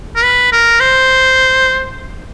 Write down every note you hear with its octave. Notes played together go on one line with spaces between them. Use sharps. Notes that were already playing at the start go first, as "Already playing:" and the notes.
A#4
B4
A#4
C5